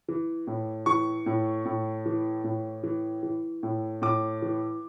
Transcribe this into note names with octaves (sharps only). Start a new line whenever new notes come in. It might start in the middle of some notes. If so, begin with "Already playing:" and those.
E3
A2
E3 C#6
A2
A2
E3
A2
E3
E3
A2
A2 D6
E3